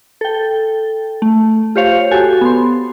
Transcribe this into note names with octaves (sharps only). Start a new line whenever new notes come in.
A4 G5
A3
F4 G4 C5 C#5 F5
F#4 G4 A4 G#5
B3 C6